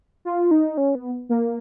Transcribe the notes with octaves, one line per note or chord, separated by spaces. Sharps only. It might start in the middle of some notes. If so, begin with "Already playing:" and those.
F4
D#4
C#4
B3
A#3